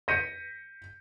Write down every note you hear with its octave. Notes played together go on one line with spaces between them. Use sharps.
G6 A#6 B6 C#7 D#7